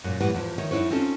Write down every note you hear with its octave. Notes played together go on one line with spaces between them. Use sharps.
F#2 A#2
A2 E3 G3 B3
E2 F3
D#3 C#5 E5
F#2 D#4 E4 B4 C#5
C4 C#4 D#4 F4 A4